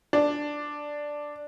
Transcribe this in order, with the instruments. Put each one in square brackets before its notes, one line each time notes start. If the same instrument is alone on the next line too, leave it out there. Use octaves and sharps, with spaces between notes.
[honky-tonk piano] D4